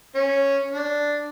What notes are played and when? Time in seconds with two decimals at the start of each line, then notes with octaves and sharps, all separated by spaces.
0.15 C#4
0.72 D4